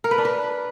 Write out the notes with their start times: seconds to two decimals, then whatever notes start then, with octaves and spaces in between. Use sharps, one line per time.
0.04 A#4
0.11 B4
0.18 D4
0.25 B4